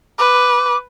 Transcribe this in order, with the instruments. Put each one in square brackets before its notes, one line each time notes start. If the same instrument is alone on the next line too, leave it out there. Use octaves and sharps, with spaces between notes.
[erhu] B4 [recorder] D6